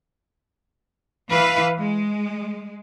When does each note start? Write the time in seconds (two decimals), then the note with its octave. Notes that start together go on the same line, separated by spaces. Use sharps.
1.30 E3 B4 F5
1.80 G#3